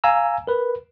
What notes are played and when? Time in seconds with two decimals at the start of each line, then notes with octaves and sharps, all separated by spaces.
0.04 F5 G#5 A#5 E6
0.47 A#4 B4